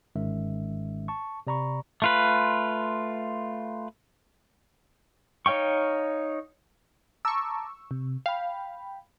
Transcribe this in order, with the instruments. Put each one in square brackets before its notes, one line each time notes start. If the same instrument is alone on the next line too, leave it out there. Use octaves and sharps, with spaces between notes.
[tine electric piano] G1 G#2 D#3 G#3 C#4 E5
A5 C#6
C3 D5 A#5 B5 C#6
[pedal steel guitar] A3 F4 B4
D#4 C#5 F5 G5 C#6
[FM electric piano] A5 A#5 D6 [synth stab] C#6 E6
[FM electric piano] C3
[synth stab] F5 [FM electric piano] G5 B5